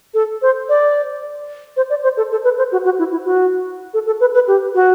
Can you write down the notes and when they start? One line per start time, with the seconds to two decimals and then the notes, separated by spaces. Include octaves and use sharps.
0.14 A4
0.42 C5
0.69 D5
1.76 C5
1.90 D5
2.03 C5
2.17 A4
2.31 A4
2.44 B4
2.58 C5
2.72 F#4
2.85 F#4
2.99 E4
3.11 E4
3.25 F#4
3.94 A4
4.06 A4
4.20 B4
4.34 B4
4.47 G4
4.75 F#4